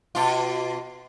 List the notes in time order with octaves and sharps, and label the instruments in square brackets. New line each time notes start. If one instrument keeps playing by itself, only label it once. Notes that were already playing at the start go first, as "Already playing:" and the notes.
[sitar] B2 F4